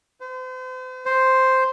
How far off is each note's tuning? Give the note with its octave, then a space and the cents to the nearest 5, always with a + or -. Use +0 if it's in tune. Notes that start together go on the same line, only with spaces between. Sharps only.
C5 -40
C5 +0